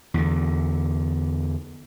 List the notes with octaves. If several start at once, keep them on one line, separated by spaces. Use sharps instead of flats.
E2 D3